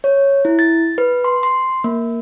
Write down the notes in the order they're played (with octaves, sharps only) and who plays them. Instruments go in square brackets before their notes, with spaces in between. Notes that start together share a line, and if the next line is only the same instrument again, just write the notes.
[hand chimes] C#5
E4
A6
B4
C6
C6
A#3